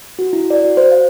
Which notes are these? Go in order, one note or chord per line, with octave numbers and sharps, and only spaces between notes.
F#4
E4
D5
F#4
C5
F5